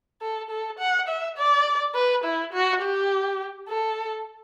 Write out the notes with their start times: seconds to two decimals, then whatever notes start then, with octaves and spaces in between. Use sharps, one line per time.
0.21 A4
0.50 A4
0.79 F#5
1.08 E5
1.37 D5
1.95 B4
2.24 E4
2.53 F#4
2.82 G4
3.69 A4